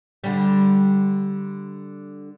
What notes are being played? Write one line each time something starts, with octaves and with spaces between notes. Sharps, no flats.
D3 G3